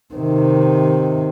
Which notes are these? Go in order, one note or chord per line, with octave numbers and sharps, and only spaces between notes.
C3 D#3